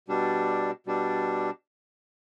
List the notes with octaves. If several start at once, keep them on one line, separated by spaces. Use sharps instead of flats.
B2 G3 D4
B2 G3 D4